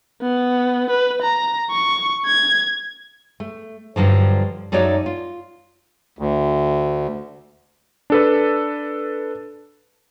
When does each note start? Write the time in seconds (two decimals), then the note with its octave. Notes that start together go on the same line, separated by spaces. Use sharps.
0.22 B3
0.90 B4
1.22 A#5
1.71 C#6
2.25 G#6
3.40 A3
3.96 G2 D3 F3 F#3
4.72 F#2 A3 D#4 F#4 C#5 D5
5.06 F4
6.19 D2
8.10 D4 A4 B4